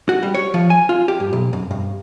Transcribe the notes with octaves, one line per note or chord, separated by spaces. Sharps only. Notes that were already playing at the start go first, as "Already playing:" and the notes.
F#4
G3
C#5
F3
G#5
F4
G4
G2
B1
F#2
G2